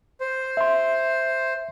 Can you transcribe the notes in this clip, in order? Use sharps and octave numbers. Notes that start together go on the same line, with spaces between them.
C5
E5 C6